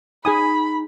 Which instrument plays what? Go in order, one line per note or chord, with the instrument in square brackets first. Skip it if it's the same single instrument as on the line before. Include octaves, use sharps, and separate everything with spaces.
[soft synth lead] D#4 [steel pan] G#4 G#5 D#6 [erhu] B5